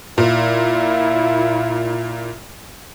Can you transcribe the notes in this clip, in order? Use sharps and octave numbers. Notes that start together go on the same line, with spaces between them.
A#2 E4 F4